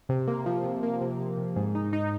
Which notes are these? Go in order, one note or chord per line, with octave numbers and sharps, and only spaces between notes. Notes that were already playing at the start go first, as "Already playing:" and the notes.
C3
A#3
F3
C3
A#3
C3
C3
C3
G#2
D#4
D#4